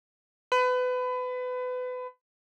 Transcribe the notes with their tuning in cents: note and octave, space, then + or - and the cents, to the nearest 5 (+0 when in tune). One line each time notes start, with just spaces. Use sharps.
B4 +30